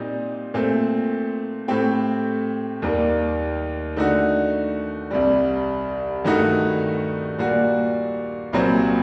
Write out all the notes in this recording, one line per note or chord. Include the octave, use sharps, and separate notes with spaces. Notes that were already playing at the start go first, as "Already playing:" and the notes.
Already playing: A#2 G3 C4 D#4
A#2 A3 C4
A2 A3 C4 G4
D#2 D#3 G3 A#3
D3 A3 D#4 F#4
C2 C3 G3
G2 D#3 A3 D#4 F#4
A#2 G3 A#3 F#4
C2 A#2 F#3 C4